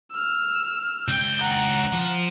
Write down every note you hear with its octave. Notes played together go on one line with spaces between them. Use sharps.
E6 F6
C#2 G5 G6
F#5 A#5
F3